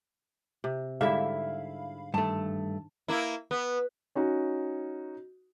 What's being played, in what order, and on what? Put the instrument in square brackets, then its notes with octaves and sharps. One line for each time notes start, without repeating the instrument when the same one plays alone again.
[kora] C3
[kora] G#2 D3 G3 [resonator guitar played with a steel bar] E4 E5 [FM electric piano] F5 B5
[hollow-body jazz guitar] G2 A3 [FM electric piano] D#3 [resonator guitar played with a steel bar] A5
[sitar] A#3 E4
B3
[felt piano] C#4 D#4 F#4